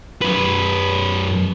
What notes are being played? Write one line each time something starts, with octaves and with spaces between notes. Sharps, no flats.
F#2 B4